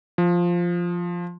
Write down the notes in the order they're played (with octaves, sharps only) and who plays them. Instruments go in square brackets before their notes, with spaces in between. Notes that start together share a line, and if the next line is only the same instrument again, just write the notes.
[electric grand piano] F3